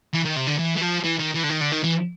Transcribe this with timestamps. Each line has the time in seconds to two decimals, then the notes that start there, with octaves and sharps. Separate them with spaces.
0.13 E3
0.25 D#3
0.36 C3
0.47 D3
0.59 E3
0.77 E3
0.82 F3
1.04 E3
1.19 D#3
1.34 E3
1.44 D3
1.50 D#3
1.61 D3
1.72 D#3
1.84 E3